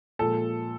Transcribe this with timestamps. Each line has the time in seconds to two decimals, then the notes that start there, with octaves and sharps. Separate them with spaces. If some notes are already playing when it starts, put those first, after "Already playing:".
0.19 A#2 F3 G#3 A4